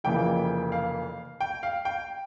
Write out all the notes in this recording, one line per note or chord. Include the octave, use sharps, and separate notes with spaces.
F1 F2 C#3 E3 A#3 G5
F5
G5
F5
G5